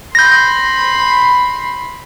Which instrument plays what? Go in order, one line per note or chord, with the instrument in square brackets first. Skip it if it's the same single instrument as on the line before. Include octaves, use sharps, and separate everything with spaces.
[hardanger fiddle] B5 C6 [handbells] G6 A#6